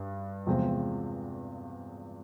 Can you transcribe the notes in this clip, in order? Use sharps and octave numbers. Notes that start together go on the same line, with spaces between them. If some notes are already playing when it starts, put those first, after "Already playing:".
Already playing: G2
E2 C3 F3 G#3 C4